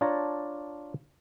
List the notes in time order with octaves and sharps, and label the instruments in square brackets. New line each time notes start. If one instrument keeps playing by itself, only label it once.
[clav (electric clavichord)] D4 F4 C#5 D5 A5 A#5